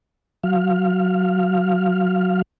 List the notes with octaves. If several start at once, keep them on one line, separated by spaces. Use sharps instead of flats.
F#3 F5